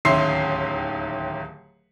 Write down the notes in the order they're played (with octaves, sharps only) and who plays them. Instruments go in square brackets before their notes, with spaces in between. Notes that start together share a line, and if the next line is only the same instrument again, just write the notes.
[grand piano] D1 D#2 C#4 E5 C6 C7